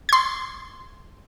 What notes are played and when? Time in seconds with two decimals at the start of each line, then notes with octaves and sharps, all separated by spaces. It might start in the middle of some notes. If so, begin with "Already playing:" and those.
0.09 C6 G#6